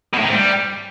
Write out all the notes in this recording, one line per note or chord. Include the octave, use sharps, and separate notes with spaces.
B2
A2
D#3
G#2
G3